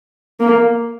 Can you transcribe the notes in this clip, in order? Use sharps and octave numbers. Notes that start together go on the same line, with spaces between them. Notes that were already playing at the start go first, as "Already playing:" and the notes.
A#3